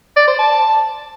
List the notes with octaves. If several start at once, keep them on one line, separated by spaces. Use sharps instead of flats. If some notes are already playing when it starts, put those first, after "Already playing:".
D5
C5
A5